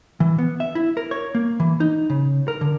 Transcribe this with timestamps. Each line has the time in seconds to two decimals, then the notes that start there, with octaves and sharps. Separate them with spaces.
0.20 E3
0.39 B3
0.60 E5
0.75 E4
0.97 A#4
1.11 C#5
1.35 A#3
1.60 E3
1.80 D#4
2.10 C#3
2.48 A#4
2.61 D3